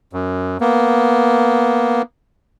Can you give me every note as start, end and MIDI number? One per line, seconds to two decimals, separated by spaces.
0.13 0.57 42
0.61 2.02 58
0.61 2.02 59